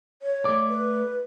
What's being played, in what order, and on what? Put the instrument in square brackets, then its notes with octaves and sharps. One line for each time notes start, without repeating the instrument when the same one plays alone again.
[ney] C#5
[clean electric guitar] A3 D5
[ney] B4